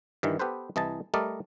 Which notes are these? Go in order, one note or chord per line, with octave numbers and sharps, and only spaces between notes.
G2 D#3 E3
B3 G4 A4 B4 C5
C2 E3 D#5 G#5 A5
G3 A3 A#4 D5 D#5